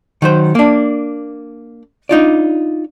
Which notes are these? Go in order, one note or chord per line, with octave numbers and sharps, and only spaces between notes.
D#3 F#3 C5
A#3 D4
D4 D#4 F4 D5